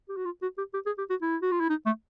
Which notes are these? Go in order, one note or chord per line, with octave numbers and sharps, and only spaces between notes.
G4
F#4
F4
F#4
G4
G4
G#4
G4
F#4
E4
F#4
F4
E4
D#4
A3